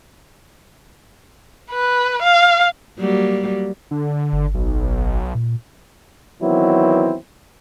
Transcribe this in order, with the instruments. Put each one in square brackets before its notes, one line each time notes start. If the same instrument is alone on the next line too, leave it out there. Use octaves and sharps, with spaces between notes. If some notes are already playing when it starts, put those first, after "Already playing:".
[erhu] B4
F5
[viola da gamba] F#3 G3 A#3
[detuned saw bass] D3
[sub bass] G1
[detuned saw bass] B1
[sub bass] A#2
[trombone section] D#3 E3 F#3 B3 C4 E4